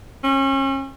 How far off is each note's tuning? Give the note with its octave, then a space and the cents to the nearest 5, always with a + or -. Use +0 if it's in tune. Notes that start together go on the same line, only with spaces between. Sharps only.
C#4 -35